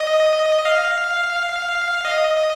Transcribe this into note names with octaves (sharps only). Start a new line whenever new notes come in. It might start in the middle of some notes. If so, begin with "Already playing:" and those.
Already playing: D#5
F5
D#5